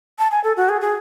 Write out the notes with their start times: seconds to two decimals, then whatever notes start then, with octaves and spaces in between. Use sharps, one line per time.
0.19 A5
0.31 G#5
0.44 A4
0.57 F#4
0.69 G#4
0.81 G#4